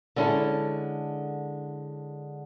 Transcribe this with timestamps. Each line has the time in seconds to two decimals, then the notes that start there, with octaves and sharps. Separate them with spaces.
0.16 D3 G#3 C#4 E4 A4